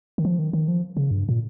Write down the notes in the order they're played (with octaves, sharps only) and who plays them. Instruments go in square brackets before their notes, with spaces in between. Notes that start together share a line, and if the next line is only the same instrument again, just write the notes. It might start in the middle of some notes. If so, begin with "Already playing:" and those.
[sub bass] D#3
F3
D#3
D#3
F3
C#3
G2
A#2